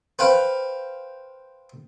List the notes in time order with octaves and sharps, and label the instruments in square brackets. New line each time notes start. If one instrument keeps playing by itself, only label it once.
[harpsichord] B4 C5 F5 G5